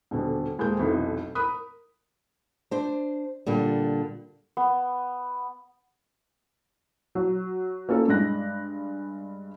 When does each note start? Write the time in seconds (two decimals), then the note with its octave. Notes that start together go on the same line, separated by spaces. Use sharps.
0.11 D#1 B2 D3
0.58 D#1 G#3 A#3 G6
0.79 F1 B1 F2 E3
1.35 A#4 B5 D#6 F#6
2.71 D4 C5
3.46 A#2 D3 G3
4.57 B3
7.15 F#3
7.89 A#3 C#4 F4 A4 A#4
8.08 G2 G#3 F#6 A#6